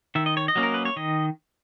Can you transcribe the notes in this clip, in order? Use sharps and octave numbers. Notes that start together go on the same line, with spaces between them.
D#3 E5
D#5
C#5
D#5
F#3 A#3 C#4
A#4
B4
C#5
D#3 D#5